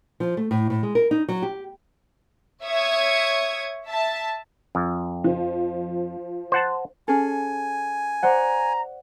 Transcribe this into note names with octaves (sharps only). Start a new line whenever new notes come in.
F3
A3
A2
A2
G#3
A#4
D#4
F#3
G4
C#5 E5 C#6 D#6 G#6
E5 A5
F2
F3
C5 F#5 A5
C#4 G#4 A4 G#5
C5 D5 F#5 A#5